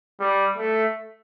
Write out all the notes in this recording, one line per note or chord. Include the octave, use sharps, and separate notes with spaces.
G3
A3